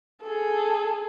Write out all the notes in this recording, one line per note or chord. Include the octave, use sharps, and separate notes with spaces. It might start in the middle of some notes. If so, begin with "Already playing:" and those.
G#4 A4